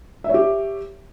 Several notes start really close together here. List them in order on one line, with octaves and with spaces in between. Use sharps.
E5 C#5 G4